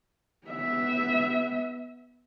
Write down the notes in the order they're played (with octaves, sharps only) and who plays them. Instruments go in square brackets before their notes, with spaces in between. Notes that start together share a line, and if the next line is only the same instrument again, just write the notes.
[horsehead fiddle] B3 E5